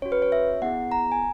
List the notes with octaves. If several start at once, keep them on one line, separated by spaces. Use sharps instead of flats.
C#4 F#4 C#5
B4
C#5
E5
B3 E4 G#4 F#5
A#5
G#5